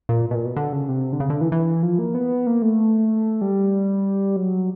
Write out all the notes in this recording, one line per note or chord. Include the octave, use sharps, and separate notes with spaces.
A#2
B2
A#2
B2
D3
C#3
C3
D3
C#3
D3
E3
E3
F3
A#3
B3
A#3
A3
G3
F#3